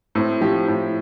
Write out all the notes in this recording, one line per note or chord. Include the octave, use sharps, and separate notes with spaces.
A2 C4
F3 G4
A2